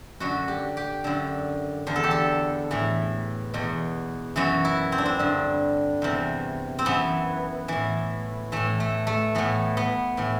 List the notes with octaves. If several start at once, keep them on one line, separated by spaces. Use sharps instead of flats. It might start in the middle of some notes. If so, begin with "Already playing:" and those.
F#2 D3 F#4
G4
G4
F#2 D3
E2 D3
A4
G4
A4
A2 E3
E2 B2
F#2 E3 F#4
E4
C4
D4
C4
G2 D3
E2 C3 E3
C4
F#2 E3 B3
A2 E3
A2 E3 A3
A3
A3
A2 E3 B3
B3
A2 E3